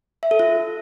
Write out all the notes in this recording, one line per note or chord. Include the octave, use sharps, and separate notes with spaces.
E5
A4
F4